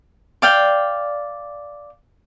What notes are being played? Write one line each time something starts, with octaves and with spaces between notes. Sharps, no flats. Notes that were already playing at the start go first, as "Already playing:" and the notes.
D5 F5 G5